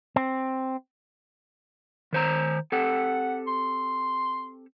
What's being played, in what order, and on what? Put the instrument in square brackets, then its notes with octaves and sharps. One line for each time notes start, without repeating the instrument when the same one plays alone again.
[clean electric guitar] C4
[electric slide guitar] D#3 C5 A#5
[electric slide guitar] C4 G4 A4 [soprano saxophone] F#5
[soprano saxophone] C6